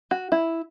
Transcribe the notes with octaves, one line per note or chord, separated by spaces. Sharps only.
F#4
E4